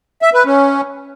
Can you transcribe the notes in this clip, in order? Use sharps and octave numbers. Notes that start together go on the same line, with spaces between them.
E5
B4
C#4